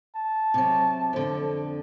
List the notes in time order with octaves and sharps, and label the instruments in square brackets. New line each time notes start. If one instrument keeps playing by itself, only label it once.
[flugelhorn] A5
[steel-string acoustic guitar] C3 F#3
F2 D3